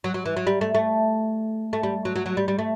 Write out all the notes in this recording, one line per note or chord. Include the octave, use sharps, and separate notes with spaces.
F#3
F#3
E3
F#3
G3
A3
A3
A3
G3
F#3
F#3
F#3
G3
G3
A3